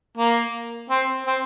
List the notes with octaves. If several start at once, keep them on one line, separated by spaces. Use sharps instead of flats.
A#3
C4
C4